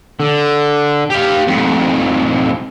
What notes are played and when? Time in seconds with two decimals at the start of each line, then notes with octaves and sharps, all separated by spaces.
0.20 D3
1.10 G4 F5
1.47 F2 G#2